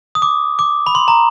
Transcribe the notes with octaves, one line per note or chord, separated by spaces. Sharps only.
D#6
D6
D6
B5
C6
A#5